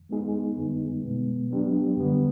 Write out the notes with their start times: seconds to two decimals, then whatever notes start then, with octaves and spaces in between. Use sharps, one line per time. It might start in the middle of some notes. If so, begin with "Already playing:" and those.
0.09 G#3 B3 D#4 G#4
0.56 F#2 D3 G3 B3 D#4
1.02 B2 G#3 B3
1.50 F#3 B3 D4 G4
1.96 F#2 D3 G3 B3